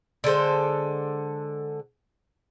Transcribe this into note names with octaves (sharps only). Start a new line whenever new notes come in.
D3 G#3 A4 C5